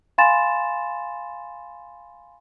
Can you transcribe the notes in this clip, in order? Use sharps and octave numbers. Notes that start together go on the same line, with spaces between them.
F5 G#5 B5 C6 A6 E7